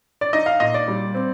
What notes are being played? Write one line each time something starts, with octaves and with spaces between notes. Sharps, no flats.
D5
D#4 D#5
F5
A#2 D#5
D5
G3
C4